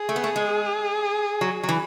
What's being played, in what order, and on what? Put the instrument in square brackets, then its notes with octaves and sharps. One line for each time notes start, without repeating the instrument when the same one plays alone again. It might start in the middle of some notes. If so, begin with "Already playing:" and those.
Already playing: [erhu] G#4
[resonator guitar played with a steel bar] A3
B3
A3
G#3
F#3
F#3
E3